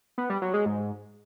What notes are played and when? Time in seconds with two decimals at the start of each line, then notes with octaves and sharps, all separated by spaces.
0.18 B3
0.30 G3
0.42 F#3
0.54 G#3
0.66 G#2